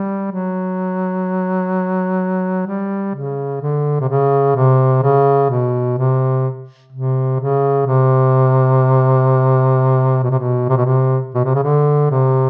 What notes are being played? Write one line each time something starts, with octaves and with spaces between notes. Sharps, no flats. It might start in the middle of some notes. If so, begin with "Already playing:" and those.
Already playing: G3
F#3
G3
C#3
D3
C3
C#3
C3
C#3
B2
C3
C3
C#3
C3
B2
C3
B2
C3
B2
C3
B2
C3
C#3
D3
C3